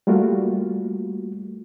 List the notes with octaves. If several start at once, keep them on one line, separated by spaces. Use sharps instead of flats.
G3 A3 A#3 F4 F#4